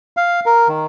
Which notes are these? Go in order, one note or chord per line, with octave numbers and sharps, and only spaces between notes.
F5
A#4
D#3